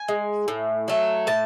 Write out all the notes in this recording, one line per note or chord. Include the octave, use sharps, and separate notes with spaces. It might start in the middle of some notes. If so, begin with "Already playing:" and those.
Already playing: G#5
G#3
A2
F#3 A3
A2 A5